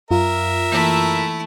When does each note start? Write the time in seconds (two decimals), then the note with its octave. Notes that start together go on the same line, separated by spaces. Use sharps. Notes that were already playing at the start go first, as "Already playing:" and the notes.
0.11 F#2 F4 A#4 E5
0.72 E3 A3 A#3 E4 A#6